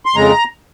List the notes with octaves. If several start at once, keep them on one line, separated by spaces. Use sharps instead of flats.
C6
F2 C#3 G#3 A#5